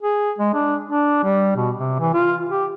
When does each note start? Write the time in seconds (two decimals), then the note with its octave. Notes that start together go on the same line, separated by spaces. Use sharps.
0.03 G#4
0.38 G#3
0.54 D4
0.84 D4
1.24 G3
1.57 B2
1.77 C3
1.99 E3
2.13 F4
2.49 G4